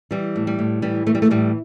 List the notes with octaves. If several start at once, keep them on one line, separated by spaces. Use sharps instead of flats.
E3 G3
A2
G3
A2
E3 G3
E3 A3
G3
A3
A2 G3